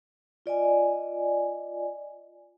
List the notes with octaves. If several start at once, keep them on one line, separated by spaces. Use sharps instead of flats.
F4 D5 D#5 G#5